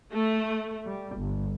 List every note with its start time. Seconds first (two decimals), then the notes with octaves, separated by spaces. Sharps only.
0.12 A3
0.87 G3
1.17 G1